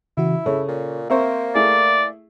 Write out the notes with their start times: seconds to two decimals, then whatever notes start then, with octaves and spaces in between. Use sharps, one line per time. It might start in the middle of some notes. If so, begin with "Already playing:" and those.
0.17 C#3 E3 E4 F#4
0.46 C#3 A4 C#5
0.68 A#2
1.10 A#3 C4 A#4 C5 E5 C#6
1.55 A3 E4 G#4 D5